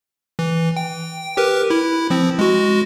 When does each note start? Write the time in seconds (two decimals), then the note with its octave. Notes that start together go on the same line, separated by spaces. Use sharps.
0.39 E3
0.77 G5
1.37 G4 A#4 B4
1.70 E4
2.10 F3 C4
2.39 G#3 F#4